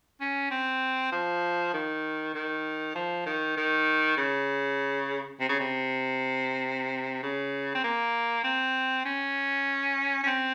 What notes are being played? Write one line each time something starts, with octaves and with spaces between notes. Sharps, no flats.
C#4
C4
F3
D#3
D#3
F3
D#3
D#3
C#3
C3
C#3
C3
C#3
C4
A#3
C4
C#4
C#4
C4